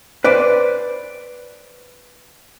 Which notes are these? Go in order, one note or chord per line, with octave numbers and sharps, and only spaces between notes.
B4 C5 D5